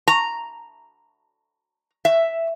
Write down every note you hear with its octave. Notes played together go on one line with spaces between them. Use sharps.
A#5
E5